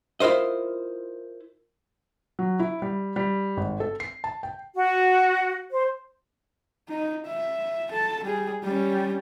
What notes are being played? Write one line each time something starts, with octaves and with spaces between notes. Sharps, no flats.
E4 F4 A#4 C5 D#5
F#3
E4
G3
G3
G#1
A4
C7
A5
G5
F#4
C5
D#4
E5
A4 A5
G3 G#4
G3 C#4